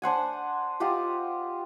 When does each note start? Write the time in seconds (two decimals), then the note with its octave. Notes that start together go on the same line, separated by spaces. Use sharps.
0.02 D4 C5 F#5 G#5
0.80 F4 G4 D#5 F#5